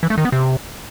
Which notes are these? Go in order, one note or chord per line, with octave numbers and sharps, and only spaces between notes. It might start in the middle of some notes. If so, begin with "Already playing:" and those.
E3
A3
D#3
B3
C3